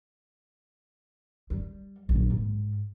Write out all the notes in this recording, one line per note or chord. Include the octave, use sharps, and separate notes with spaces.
G3
A#1 F#3
G#2